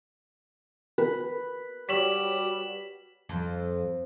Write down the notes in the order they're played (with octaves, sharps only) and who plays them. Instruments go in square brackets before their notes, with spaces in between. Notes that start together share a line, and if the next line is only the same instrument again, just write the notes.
[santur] B4
[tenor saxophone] G3 [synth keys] F#4 G4 C#5 [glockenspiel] B6 E7 F#7
[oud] F2